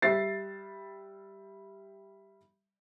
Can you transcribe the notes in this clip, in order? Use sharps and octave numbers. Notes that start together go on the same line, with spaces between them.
G3 E5 A6 C7